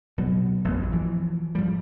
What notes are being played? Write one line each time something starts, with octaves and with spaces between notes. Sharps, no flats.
B2 F#3
A1 F#2 B3
A#1 F#3
E3 F3
G#2 F3 G3